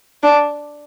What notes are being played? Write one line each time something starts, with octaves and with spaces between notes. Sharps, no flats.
D4